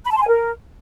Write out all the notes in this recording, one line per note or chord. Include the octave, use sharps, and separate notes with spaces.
B5
A5
C6
G#5
A#4